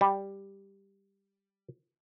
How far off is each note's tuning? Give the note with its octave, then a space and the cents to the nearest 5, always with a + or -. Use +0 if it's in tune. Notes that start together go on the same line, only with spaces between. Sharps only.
G3 +5